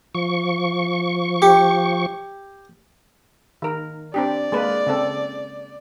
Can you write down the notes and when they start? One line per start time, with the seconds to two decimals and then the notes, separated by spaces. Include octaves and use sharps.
0.15 F3 C#6
1.42 G4
3.62 D#3 A#4
4.14 C4 D4 G4 D5
4.52 G#3 A#3 B4
4.87 C#3 C4 A4